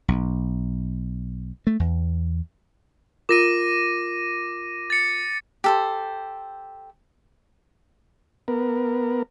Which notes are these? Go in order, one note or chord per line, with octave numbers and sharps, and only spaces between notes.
B1
A3
E2
F4 A#4 D6 A#6 D#7 E7
A6 C#7
G4 A4 C5
B3 A#4